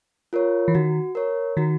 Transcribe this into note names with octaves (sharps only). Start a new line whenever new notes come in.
F4 A#4 C#5
E3
D#3 F#4
A#4 C#5
D#3 F#4